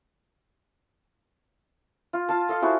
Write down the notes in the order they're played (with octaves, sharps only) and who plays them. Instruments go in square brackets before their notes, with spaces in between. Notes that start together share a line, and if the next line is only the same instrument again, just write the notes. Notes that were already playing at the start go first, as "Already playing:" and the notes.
[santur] F4
F4 F5 A5
A4 D#5 F5
E4 F#4 G#4 C5